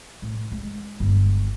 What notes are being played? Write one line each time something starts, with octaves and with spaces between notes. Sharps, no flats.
A2
G#3
G1